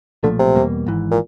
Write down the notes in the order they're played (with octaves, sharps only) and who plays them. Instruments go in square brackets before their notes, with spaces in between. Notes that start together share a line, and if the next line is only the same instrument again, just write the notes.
[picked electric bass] B1 A#2 F3 A3 [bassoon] D3
[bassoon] C3
[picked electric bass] E2 B2 G3 A#3
G#1 G#2 E3
[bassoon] A#2